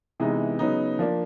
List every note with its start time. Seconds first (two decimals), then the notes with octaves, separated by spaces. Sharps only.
0.20 C3 E3 G#3 B3 D#4
0.59 C#3 F#3 B3 D#4
0.99 F3 A#3 D4